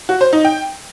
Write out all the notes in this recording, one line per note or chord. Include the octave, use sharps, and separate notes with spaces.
F#4
C5
D#4
G5